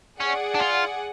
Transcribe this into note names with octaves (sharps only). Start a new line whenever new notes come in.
C#4 G#4 D5 F#5
D4
F4